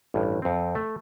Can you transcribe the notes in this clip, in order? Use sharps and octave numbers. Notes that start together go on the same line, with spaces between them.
A1 G2
F2 C4
A3